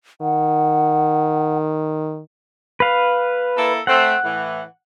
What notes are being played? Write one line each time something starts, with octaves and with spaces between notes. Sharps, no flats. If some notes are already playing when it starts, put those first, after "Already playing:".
D#3 F#5
B4 F5
A#3 E4 A4
A3 C4 F#5
A2 E3